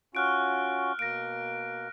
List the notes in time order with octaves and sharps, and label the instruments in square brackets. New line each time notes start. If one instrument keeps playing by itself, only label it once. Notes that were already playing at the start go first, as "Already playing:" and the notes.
[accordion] C#4 F4 F#4 [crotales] F6 F#6 D7
[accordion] B2 A#3 [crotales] A#6 D7